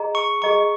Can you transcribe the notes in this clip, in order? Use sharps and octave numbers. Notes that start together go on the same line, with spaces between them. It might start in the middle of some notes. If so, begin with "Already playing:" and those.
Already playing: G#4 D#5 A#5
C#6
G#4 D#5 A#5 C#6